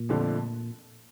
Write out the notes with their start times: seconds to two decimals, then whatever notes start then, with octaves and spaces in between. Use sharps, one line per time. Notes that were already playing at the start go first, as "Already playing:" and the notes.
Already playing: A#2
0.09 F2 D3 F3 A3 D4